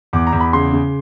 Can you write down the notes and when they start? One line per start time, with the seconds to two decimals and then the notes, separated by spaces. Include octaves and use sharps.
0.13 E2 D6
0.27 A#5
0.33 E2
0.40 B5
0.53 C#3 C6
0.73 C#3